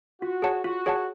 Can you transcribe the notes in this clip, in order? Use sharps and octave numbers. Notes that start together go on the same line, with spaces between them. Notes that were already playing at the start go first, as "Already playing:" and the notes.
F4 F#4
G#4 C#5 F#5 A5
F4 F#4
G#4 C#5 F#5 A5